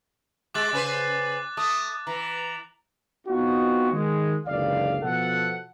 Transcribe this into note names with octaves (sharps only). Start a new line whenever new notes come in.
G#3 G4 D6 F#6 A6
C#3 B4 C5 G#5
A3 D#6
E3 A#5
B3 C4 D#4 F4 F#4
D#3 G#3
F#1 C#2 D3 E3 D5 F5
B2 F3 A4 F#5